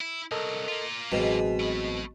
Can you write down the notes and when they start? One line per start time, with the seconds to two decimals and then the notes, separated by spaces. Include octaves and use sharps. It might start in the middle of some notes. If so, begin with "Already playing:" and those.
0.01 E4
0.31 C2 F#3 A4 A#4 D#5
0.68 A#3 F4
1.12 A1 B2 F#3 G#3 C4
1.60 A3 B5